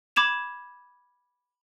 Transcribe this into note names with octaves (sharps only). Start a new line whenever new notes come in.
B5 D6 G#6 E7 F7